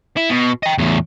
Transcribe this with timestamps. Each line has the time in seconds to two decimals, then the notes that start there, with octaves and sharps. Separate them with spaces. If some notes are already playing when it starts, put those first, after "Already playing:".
0.17 E4
0.30 B2
0.63 D#5 G5
0.78 E2 A2